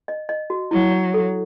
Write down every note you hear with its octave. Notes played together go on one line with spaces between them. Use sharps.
D#5
D#5
F#4
F#3 E4
C#5
A4